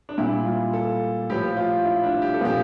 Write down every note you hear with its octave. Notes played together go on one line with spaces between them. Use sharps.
D4
A#2 G3 E4
F4
A4
A2 F3 G4
F4
E4
D4
G4
A4
A#2 F3 G4